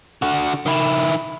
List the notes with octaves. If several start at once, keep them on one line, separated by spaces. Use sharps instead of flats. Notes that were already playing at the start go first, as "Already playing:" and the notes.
D3 F#4
D#3 E4